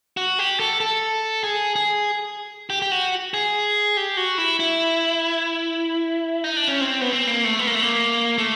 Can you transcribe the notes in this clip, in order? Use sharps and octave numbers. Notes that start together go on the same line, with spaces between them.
F#4
G4
A4
A4
G#4
G#4
G4
G4
F#4
G#4
G4
F#4
E4
E4
D#4
D4
C#4
C4
B3
C4
A#3
A3
B3
A#3
A3
A#3
A3